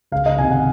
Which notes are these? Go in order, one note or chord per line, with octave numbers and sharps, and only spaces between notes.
C#2 F5
D#5
C3 D#3 G#5
F#5